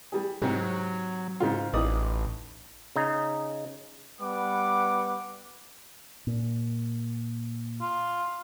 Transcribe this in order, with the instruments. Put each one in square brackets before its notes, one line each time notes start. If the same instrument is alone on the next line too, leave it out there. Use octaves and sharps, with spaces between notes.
[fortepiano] G3 G#4
[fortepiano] G#2 C3 [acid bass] F#3
[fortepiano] G#2 C#3 F4
[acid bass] A1 [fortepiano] D#4 D5 D#6
[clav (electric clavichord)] C#3 D#4
[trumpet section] G3 B3 B4 F#5 D6
[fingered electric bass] A#2
[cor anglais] F4